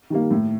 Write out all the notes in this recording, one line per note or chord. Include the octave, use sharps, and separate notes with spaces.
D#3 G3 A#3
A2